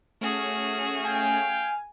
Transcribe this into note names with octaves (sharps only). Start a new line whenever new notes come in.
A3 C#4 F#4 G#4
F5 G5 G#5